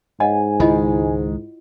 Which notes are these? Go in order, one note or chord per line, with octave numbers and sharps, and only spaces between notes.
G#2 C#5 D#5 F#5 G#5
C#2 D#3 G#3 E4 F4 D#5